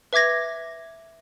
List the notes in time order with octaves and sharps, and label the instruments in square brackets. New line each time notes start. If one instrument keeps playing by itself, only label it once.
[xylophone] B4 E5 D6 G#6 A#6